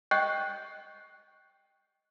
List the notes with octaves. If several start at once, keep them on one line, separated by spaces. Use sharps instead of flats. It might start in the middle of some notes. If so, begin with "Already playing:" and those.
D#5 G5 C#6 F#6 G6